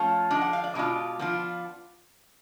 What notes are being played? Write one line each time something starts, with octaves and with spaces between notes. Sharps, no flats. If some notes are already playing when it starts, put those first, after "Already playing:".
Already playing: F3 A3 C#4 F4
F3 G#3 D4
F#5
F5
D5
B2 G#3 D4 F4
F3 B3 D4 F4